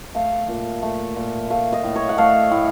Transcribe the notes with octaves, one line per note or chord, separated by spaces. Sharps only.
A3 F5
A#2
A3
A#2
A3 F5
D#5
A2
C#5
F#5
A3 F5
A2